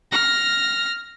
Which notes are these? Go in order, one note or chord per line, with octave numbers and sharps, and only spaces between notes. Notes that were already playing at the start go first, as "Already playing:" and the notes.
F6 A#6